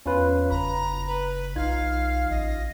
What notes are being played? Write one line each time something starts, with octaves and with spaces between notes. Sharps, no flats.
E2 C#4 F4 B4
F#1 A#5 B5
B4
B1 D#4 F4 F5 G#6
A1 D#5